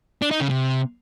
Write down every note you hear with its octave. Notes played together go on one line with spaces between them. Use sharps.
D4
D#4
C#3
C3